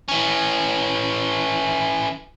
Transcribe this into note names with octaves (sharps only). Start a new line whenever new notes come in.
E3 C#4